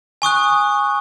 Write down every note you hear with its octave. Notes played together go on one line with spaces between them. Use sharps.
G#5 C#6 D#6 F#6